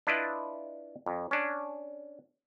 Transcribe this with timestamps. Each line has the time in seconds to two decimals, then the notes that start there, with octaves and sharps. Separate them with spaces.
0.07 D4 E4 F4 B4 D5 D#5
1.06 F2
1.31 C#4 D4